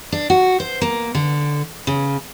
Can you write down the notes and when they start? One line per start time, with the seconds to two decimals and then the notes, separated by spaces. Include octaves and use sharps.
0.12 D4
0.30 F#4
0.60 C5
0.82 A#3
1.15 D3
1.87 C#3